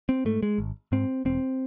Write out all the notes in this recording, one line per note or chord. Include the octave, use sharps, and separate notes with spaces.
C4
G#2 A3
G#3
G#1
G#2 C4
E1 C4